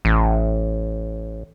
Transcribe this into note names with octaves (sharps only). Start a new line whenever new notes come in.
A1